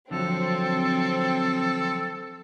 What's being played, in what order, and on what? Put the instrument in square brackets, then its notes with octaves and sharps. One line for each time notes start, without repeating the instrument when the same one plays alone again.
[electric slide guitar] D3 F3 F#3 [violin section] C4 [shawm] A4